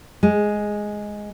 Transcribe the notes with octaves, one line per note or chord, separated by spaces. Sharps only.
G#3